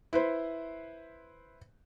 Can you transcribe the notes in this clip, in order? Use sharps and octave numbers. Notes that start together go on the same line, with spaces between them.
E4 B4 C5